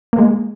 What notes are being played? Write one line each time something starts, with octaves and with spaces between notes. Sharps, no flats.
A#3
G#3